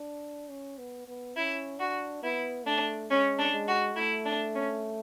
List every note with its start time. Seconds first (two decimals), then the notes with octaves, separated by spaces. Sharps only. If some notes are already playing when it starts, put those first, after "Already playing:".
Already playing: D4
0.49 C#4
0.78 B3
1.07 B3
1.36 C#4 E4
1.79 D4 F#4
2.23 B3 E4
2.66 A3 D4
3.10 G#3 C#4
3.38 D4
3.52 G#3
3.68 F#4
3.96 A3 E4
4.25 D4
4.54 C#4